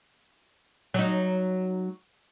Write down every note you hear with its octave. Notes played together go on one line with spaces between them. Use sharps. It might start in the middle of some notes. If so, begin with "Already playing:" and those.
F#3 D#4